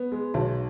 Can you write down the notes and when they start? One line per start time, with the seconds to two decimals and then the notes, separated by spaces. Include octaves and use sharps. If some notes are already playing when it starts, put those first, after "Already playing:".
Already playing: B3
0.12 G#3
0.34 B1